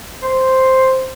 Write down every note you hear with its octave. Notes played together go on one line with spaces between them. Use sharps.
C5